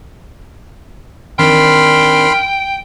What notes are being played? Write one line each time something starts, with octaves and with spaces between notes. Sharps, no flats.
D#3 C4 D4 G5 B5 C6 F6